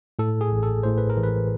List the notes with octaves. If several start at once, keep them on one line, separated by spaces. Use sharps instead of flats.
A2 A4
G#4
A1
A4
A2 C5
B4
A#4
E3
B4